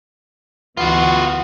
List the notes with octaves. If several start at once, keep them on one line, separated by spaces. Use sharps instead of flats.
D2 E3 B3 F4 F#4